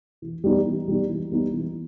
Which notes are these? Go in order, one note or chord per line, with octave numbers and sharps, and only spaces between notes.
E3
G3 B3 D#4
E3
G3 B3 D#4
E3
G3 B3 D#4
E3